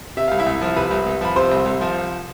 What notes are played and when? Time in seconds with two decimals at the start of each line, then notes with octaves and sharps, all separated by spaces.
0.17 C3 E5
0.28 C2 F5
0.39 E4 E5
0.46 C2
0.61 F3
0.76 C3 B4 B5
0.91 C2
1.06 C2
1.21 F3 B5
1.36 C3 C5 C6
1.51 C2
1.66 C2
1.81 F3